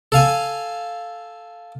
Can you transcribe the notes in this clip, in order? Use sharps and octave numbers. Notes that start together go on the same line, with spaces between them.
A4 F5 G#5